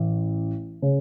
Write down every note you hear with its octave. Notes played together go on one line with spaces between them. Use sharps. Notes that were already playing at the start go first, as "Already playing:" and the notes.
Already playing: A1
C#3